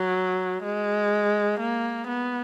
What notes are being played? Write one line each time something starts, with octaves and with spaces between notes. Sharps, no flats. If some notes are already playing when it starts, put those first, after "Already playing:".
Already playing: F#3
G#3
A#3
B3